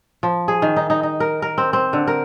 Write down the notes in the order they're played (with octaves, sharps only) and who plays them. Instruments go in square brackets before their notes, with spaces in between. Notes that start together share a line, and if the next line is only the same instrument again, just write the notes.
[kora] F3
G#4
D#3
D#4
D#4
D#4
A#4
A#4
C4
C4
D3
A#4